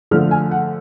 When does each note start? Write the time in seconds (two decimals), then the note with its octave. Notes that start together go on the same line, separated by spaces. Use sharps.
0.11 D3 F3 A3 F6
0.31 G#5
0.51 F#5